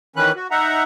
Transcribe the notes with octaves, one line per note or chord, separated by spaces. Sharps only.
D#3 E3 C#4 B4 F#6
F#4
D#4 E5 F#5 A#5